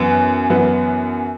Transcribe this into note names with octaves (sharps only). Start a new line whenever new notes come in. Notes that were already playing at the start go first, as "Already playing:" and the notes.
Already playing: F#2 E3 B3
F#2 E3 B3